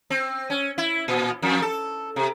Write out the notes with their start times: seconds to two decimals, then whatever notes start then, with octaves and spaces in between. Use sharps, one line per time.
0.10 C4
0.50 C#4
0.78 E4
1.08 A#2
1.42 F2
1.62 A4
2.16 C3